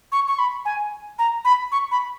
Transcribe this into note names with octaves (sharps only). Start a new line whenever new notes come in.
C#6
C#6
B5
G#5
A#5
B5
C#6
B5